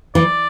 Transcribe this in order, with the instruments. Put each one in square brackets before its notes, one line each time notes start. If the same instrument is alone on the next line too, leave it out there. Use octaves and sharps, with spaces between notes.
[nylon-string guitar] E3 [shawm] D5